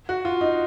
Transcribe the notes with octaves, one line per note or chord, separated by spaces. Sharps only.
F#4
F4
D#4